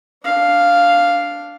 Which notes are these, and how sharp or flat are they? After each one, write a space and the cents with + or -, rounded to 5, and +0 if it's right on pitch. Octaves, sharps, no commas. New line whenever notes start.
D4 -10 F5 +0